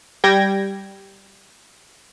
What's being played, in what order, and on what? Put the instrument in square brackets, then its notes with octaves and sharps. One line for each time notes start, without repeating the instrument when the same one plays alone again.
[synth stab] G3 G5 G#6 A#6